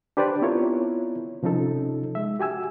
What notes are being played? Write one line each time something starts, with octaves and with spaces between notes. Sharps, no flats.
D4 G4 B4 C5 D5
B3 C4 E4 F4 A#4 C#5
C3 F3 C#4 D#4 A4
G#3 E5
F#4 G4 G#5 E6